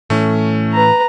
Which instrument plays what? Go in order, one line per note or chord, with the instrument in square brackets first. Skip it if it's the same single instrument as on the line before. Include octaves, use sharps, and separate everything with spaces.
[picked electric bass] A2 E3 [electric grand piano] A3 C#4
[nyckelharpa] B4 A#5